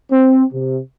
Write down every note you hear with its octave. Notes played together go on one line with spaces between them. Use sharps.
C4
C3